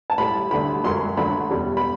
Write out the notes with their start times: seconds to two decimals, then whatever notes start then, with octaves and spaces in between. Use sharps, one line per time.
0.10 A5
0.18 A2 G3 B5
0.51 D2 D3 G3 B5
0.84 F#2 F#3 C6
1.17 D2 D3 F#3 B5
1.50 E2 B2 G3
1.77 B5